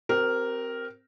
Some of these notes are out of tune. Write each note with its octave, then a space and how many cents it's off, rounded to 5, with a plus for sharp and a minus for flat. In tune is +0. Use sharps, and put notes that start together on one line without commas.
C4 +0 G4 -35 A#4 +0